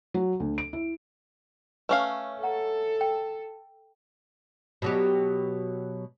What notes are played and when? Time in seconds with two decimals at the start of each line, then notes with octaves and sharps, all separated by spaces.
0.14 F#3
0.40 D2
0.58 D7
0.73 E4
1.89 A3 C#4 B4 F5 G#5 C#6
2.43 A4 F#5 A#5
3.01 G5
4.82 B2 F#3 G4